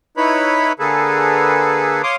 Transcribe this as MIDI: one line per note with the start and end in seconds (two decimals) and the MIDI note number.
0.17 0.72 63
0.17 0.72 64
0.17 0.72 71
0.17 0.72 73
0.17 0.72 83
0.79 2.02 50
0.79 2.02 58
0.79 2.02 68
0.79 2.02 69
0.79 2.02 71
2.03 2.16 73
2.03 2.16 77
2.03 2.16 84
2.03 2.16 86
2.03 2.16 87